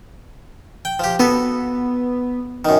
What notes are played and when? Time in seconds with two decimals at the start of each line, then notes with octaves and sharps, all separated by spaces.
0.85 G5
0.99 F3 G4
1.19 B3 F#4 A4
2.65 F#2 D#3